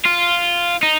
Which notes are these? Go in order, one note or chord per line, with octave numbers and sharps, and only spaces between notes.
F4
D#4